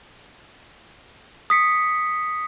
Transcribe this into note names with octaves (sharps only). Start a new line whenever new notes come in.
D#6 B6 C#7